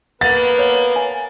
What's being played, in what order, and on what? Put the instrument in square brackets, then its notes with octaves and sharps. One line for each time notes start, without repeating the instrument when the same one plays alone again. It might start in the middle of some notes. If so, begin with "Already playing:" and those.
[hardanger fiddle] A#3 [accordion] B3 [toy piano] F#5 [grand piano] A6
[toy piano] C#5
G#5